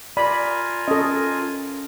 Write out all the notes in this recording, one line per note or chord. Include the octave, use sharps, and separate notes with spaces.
F4 A#4 D5 G#5 B5
C#4 A4 D#5